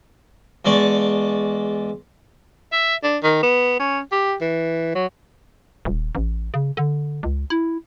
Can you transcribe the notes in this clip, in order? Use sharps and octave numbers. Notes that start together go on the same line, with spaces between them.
E2 G#3 D5 A5 C#6
E5
D4
D#3
B3
C#4
G4
E3
F#3
D#1
A1
C#3
D3
C#2
E4